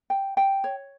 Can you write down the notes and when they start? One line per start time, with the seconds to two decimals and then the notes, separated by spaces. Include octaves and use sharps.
0.10 G5
0.37 G5
0.64 C#5